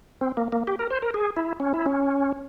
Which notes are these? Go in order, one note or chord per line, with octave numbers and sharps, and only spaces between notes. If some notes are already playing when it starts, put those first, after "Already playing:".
C4
A#3
A#3
G4
A#4
C5
A#4
G#4
E4
C#4
E4
C#4